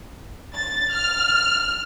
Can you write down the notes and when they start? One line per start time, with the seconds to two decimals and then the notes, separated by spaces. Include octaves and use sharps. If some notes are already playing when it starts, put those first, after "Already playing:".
0.54 A6
0.94 F6